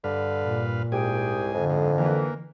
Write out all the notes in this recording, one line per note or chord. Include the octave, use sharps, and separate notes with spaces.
G2 D3 B4 F5
A#2
C2 G#2 G4 G#4 G5 G#5
F2 D3
G#2
E3 A#3